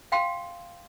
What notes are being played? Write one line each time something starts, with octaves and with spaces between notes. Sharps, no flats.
F5 G5 C6